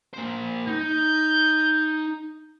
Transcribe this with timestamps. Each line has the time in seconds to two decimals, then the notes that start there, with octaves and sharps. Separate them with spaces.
0.13 A#3 C5
0.67 D#4 G6